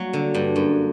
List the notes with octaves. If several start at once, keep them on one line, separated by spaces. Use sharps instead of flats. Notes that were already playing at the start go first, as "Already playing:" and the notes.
Already playing: F#3 G3 A#3 F#4
D3
G2
F#2